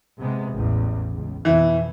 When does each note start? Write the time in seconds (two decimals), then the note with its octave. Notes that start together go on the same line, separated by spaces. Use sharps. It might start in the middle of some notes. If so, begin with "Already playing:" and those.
0.20 C3 G#3 B3
0.53 A1 E2
1.15 C#2
1.45 F2 B2 E3 E4